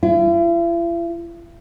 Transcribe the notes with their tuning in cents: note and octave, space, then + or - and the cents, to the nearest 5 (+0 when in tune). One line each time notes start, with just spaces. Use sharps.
E4 +45